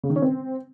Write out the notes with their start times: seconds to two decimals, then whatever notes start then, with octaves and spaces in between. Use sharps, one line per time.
0.04 C#3
0.10 D#3
0.16 C#4
0.22 C4